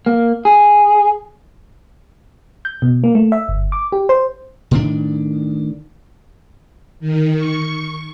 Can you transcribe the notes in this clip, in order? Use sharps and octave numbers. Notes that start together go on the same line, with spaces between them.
A#3
G#4
G6
B2
A#3
A3
E5
G1
D6
G4
C5
A2 D#3 D4
D#3
C#6